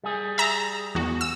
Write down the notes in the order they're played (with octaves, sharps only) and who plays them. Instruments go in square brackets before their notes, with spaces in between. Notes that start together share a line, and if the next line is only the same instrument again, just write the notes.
[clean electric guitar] G3 G#4
[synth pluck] E5 A#5
E2 F#4
E6